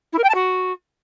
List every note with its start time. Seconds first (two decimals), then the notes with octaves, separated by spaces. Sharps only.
0.13 E4
0.18 A#4
0.24 G5
0.29 A5
0.34 F#4